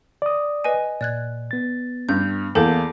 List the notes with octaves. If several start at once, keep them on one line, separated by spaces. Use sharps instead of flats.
D5 D#6
B4 D#5 G#5
A#2 D5 F#6 G#6
B3 A6
G2 G6
E2 A#3 A4 A5 G6